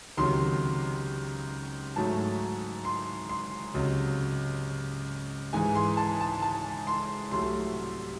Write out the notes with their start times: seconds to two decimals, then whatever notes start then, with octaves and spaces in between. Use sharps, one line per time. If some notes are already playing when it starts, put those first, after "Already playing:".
0.17 C#2 C3 D#3 F#3 C6
1.96 G#2 F#3 A3 A5
2.85 C6
3.29 C6
3.74 C#2 C3 F#3
5.53 G#2 E3 G#3 G#5
5.75 C6
5.97 A5
6.21 A5
6.42 A5
6.87 C6
7.31 C2 C3 F#3 A3 C6